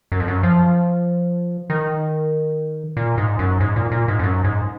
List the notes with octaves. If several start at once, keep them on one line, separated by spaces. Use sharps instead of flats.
F#2
F2
F#2
F3
D#3
A#2
G#2
F#2
G#2
A#2
A#2
G#2
F2
F#2
G#2